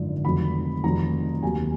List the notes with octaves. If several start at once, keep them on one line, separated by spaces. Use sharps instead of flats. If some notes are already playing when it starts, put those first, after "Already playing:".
Already playing: G#1 F#2 D3 F3
F1 F2 D#3 F#3 B5
F1 F2 D#3 F#3 A#5
F1 D#2 D#3 F#3 G#5